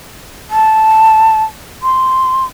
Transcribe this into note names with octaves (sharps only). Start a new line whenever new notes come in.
A5
C6